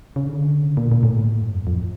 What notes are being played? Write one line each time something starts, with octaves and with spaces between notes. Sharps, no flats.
C#3
D3
C#3
A#2
A#2
A2
G2
F2
F2